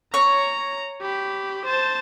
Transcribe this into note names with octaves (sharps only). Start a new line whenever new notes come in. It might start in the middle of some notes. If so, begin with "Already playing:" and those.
C#5 A#5
G4 B5
C5 A5